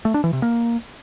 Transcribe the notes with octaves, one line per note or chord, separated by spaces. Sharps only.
A3
D4
E3
C3
A#3